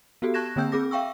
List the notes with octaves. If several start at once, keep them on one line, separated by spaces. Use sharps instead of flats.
B3 F#4 G4 A4
A5 C#6 F#6 G#6 A#6 E7
D3 A#3 C4 G5 E6 G6
C4 G#4 D6 A#6
E5 F5 G5 C#6 E6